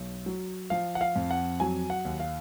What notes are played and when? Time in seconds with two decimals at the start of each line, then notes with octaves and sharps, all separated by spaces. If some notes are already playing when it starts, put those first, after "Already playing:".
Already playing: B1
0.26 F#3
0.70 F3 F5
0.95 F#5
1.01 F5
1.16 F2
1.31 F#5
1.60 F#3 G#5
1.90 F#5
2.05 D#2
2.20 F5